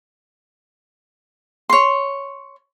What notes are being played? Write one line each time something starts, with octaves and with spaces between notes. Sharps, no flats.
C#5 C6